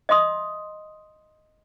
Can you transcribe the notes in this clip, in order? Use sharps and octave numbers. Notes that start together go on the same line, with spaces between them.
D#5 E5 C6 D#6